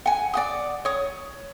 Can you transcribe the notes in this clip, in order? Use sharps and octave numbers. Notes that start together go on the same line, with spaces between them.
F#5 G#5
D5 F#5 D#6
C#5 D#6